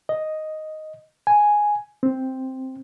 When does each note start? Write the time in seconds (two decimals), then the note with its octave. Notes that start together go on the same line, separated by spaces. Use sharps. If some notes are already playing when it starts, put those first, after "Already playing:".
0.09 D#5
1.27 G#5
2.03 C4